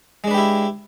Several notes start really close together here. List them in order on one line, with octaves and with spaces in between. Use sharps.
G#3 D4 B4 G4 E4